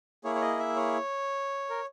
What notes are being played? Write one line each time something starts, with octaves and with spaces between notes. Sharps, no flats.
A#3 E4 G#4 C#5
C#5
D#5
E5
C#5
A#4